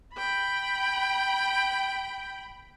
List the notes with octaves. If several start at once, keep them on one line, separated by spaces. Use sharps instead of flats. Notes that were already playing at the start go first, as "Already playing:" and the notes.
G5 B5